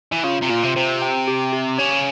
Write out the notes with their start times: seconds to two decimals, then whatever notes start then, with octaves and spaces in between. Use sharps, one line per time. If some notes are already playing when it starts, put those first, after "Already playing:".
0.12 E3
0.24 C#3 F4
0.42 C3
0.49 A#2 F4
0.63 C3
0.76 C3 C5
1.02 G5
1.28 G4
1.53 G4
1.78 C#3 C#5